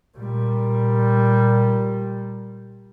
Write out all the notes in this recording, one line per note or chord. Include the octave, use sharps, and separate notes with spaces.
A#2 G3